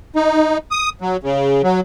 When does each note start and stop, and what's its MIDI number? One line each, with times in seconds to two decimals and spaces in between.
0.16 0.58 63
0.71 0.90 87
1.01 1.17 54
1.23 1.62 49
1.63 1.80 54